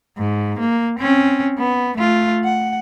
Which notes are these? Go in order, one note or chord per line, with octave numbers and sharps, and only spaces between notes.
G#2
A#3
C4 C#4
B3
A3 F4
F#5